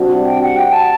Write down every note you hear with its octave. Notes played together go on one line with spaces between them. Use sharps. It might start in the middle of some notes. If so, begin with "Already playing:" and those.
Already playing: C3 G3 D4 F#4
G5
F#5
G5
A5